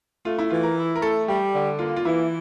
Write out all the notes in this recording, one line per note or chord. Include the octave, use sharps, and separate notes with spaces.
A3 F4
E4
E3 F4
A#4
E4
A#4
A3 A4
G3 G4
D3
A#3 F4
F4
E3 E4